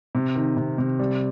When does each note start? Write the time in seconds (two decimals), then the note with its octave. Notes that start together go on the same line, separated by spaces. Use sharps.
0.15 C3
0.36 D#3
0.57 C3
0.78 C3
0.99 G3